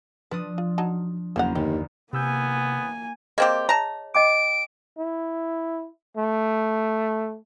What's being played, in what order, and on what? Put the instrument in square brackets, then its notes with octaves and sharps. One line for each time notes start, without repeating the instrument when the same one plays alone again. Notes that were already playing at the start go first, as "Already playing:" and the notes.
[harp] F3 D4 D#6 [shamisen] B4
[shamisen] F4
F#3 D#4 A5
[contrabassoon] F#1 [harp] E2 C5 A#5 [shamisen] A#3 C#4 F#5
[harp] G1 [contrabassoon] D#2 [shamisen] G4
[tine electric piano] C3 E6 G6 [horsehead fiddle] A#3 G#5 [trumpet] B3
[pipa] A#3 C4 G4 [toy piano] G#4 D#5
[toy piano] C#5 [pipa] A5 A#5
[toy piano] D#5 G5 D6 [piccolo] D7
[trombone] E4
A3